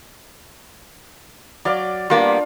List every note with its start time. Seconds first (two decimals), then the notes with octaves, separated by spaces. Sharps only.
1.65 F#3 D5 F5 D6
2.10 G3 A#3 B3 D4 F4